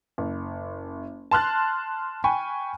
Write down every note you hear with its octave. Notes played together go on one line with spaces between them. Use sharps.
F#1
A5 C6 F6 F#6 A6
G5 G#5 B5 C#6